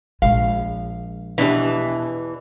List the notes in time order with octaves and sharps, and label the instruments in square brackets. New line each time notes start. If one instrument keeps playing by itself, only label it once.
[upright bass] A#1 G#3 [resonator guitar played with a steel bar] F5
[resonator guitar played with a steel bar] E2 E3 [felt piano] B2 D4 G4